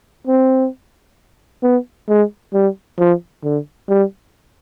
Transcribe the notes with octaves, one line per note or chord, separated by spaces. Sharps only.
C4
B3
G#3
G3
F3
D3
G3